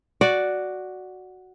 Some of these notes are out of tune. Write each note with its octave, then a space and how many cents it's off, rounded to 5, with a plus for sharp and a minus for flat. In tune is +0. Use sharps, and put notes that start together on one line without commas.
F#4 +0 D5 +0